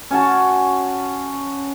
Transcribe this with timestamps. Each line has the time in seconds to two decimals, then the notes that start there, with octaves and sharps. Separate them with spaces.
0.11 C#4 F#4 A5